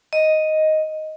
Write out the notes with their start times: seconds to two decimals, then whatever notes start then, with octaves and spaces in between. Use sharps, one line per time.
0.13 D#5